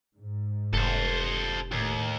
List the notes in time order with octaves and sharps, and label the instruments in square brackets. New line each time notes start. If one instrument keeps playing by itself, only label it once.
[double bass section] G#2
[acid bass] F1 [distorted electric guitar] A4 C5
[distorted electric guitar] D#2 [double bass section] A2